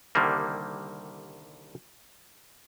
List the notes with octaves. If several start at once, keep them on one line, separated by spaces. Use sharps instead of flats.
C2 D3 D#3 G3 A#3